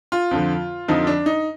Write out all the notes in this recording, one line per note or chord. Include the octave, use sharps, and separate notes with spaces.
F4
F2 D3 F3
F2 D3 F3 D#4
D4
D#4